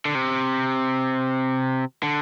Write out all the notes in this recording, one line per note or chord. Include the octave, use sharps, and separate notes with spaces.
D3
C3
D3